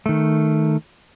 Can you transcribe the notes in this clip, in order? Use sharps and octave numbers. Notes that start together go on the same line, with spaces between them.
D#3 A3